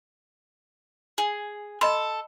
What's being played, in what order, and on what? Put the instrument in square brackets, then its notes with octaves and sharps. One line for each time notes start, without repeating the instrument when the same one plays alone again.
[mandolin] G#4
[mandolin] A4 [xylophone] D#5 B5 C6